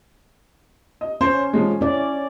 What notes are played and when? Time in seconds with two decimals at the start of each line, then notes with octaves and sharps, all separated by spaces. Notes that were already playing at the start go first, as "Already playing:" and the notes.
1.01 D#5
1.21 C#4 C5 C#5
1.53 F3 G#3
1.81 C#4 E4 D5